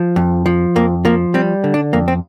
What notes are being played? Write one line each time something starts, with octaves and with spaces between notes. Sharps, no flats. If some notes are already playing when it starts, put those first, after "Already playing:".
Already playing: F3
F2
F3
F2 A#3
F3 A#3
G3 C4
D3
D4
F2 A#3
C4